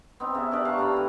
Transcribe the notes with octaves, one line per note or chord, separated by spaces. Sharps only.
B3 C4 D#4
C#3 E5
D4 G4 A#4 D5
F5 A5 C#6
A2 D4 A#5 B5
E3 A3